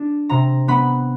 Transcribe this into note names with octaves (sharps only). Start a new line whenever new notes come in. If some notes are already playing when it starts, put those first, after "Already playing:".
Already playing: D4
C3 A#5
B3 B5